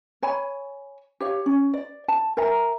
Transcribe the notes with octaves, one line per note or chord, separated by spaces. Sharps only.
C#5 G#5 B5
G4 C#5 F5
C#4
D5
A5
A#4 E5 G#5 A#5